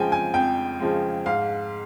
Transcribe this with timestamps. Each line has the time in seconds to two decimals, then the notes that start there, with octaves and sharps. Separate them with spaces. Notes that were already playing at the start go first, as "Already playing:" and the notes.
Already playing: F2 C#3 F3 G#3 G5 G#5
0.12 G#5
0.34 F2 G5
0.80 C#3 F3 G#3
1.26 G#2 F5